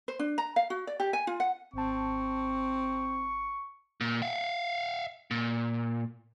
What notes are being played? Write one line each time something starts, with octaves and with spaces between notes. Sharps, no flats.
C5
D4
A#5
F5
F#4
D5
G4
G#5
F4
F#5
G#1 C4 A5 C#6
A#2
E5 F5
A#2